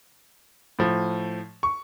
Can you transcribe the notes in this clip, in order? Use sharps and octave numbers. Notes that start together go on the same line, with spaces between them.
A2 F3
C#6